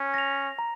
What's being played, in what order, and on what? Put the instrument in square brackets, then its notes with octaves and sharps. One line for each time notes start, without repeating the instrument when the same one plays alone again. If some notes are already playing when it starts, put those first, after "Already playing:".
Already playing: [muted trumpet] C#4
[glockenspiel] A#6 F7
A#5